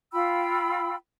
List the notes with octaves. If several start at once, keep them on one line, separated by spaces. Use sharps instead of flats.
F4 G5 B5 E6